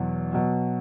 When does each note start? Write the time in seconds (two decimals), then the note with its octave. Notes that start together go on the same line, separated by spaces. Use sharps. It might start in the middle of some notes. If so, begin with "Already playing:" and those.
Already playing: E2 B2 F#3
0.33 B2 F#3